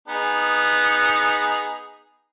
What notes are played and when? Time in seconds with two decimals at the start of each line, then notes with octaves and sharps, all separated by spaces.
0.08 B3 D#4 G#4